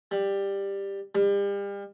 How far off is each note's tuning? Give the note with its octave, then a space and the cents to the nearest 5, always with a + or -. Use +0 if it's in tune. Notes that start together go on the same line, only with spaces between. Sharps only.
G3 +10
G3 +35